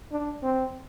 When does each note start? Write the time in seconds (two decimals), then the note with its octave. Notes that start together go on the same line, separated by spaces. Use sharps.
0.12 D4
0.43 C4